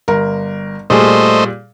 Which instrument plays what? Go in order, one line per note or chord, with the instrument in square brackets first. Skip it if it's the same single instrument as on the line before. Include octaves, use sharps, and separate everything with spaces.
[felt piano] G1 A#4
[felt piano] A#2 G3 G#4 [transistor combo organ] A3 C5 D#5